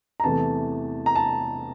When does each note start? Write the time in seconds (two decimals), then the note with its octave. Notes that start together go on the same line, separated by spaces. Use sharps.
0.20 A#5
0.24 E2 C3 E3 A3 A5
1.06 A#5
1.15 A5